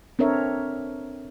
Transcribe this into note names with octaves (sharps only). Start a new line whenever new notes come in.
C4 D4 A4 A#4 C#5 E5